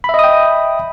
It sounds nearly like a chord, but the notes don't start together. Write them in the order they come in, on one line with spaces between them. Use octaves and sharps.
B5 E5 D#5 D#6 G5